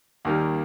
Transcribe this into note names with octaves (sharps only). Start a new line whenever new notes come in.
D#2 D#3 G3 A#3